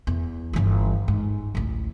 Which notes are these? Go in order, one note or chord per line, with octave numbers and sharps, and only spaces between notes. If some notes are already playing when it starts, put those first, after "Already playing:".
E2
G1 E3
G#2
A1 D2